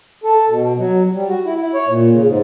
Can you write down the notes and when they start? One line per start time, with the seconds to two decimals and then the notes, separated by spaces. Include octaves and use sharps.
0.24 A4
0.49 B2
0.79 F#3
1.13 G3
1.28 F#4
1.45 E4
1.60 E4
1.74 C#5
1.87 A#2
2.12 C#3
2.25 G#2